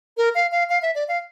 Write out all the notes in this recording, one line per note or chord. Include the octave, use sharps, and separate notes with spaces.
A#4
F5
F5
F5
E5
D5
F5